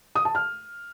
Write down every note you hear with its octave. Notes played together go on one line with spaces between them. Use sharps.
D#6
A5
F6